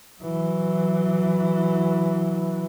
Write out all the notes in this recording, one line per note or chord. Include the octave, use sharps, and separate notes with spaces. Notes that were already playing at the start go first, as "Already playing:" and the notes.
E3 F#3